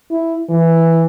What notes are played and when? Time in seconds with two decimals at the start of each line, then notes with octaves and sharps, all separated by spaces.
0.11 E4
0.50 E3